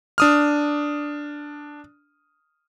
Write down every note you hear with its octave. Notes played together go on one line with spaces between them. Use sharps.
D4 D#6 F6